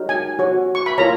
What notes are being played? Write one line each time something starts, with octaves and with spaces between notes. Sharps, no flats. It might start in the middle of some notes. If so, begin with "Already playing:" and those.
Already playing: D#4 F#4 A#4 C#5
G#5
F#4 C#5
C#6
B5
F4 A#4 C#5 A#5